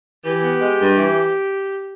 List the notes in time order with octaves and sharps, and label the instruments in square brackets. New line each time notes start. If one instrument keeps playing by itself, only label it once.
[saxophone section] E3 [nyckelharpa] G4
[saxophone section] B3
G#3
G2
E3